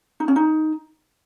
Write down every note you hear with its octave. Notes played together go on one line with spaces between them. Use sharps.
D#4
C#4
D#4